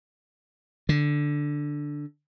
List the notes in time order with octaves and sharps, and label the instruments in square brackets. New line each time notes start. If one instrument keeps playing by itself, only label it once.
[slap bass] D3